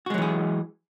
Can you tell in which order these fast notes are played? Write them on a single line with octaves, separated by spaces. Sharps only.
F#4 G#3 F#3 E3 G#4